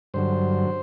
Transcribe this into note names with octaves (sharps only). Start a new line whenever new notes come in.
G2 D3 F#3 C5